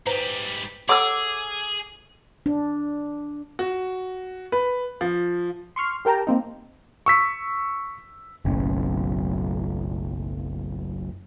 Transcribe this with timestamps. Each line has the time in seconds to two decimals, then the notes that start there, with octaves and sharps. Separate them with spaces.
0.07 G#2 G3 B4 C5 A#5
0.89 G#4 A4 C#5 F#5 D6 E6
2.46 D4
3.59 F#4
4.52 B4
5.01 F3
5.76 C6 C#6 F6 C7
6.05 G4 A#4 G5 A5 A#5
6.27 A#3 C4 D#4
7.06 C#6 E6 B6
8.45 F#1 B1 A2 C#4